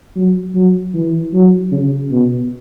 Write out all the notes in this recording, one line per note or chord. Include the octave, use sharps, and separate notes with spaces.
F#3
F#3
E3
F#3
C#3
B2